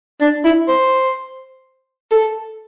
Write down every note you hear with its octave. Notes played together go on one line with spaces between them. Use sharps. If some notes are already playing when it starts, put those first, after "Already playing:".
D4
E4
C5
A4